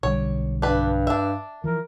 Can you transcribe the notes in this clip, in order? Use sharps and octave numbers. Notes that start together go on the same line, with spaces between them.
B1 D3 G3 C#5
G2 D4 B4
D4 E5
E3 F3 A#4